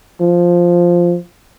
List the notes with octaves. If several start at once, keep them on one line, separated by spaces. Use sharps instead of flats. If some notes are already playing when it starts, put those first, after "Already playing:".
F3